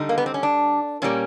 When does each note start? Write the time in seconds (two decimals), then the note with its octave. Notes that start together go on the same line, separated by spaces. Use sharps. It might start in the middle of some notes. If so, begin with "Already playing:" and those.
Already playing: D3 G3 D#4
0.09 A#3
0.18 B3
0.26 C4
0.34 C#4
0.43 D4
1.02 A#2 G3 A#3 C#4